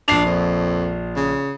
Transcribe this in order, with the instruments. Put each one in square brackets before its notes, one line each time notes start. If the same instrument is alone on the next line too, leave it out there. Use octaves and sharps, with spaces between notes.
[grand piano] A#1 C7 F7 [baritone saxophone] D4
[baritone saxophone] F2
C#3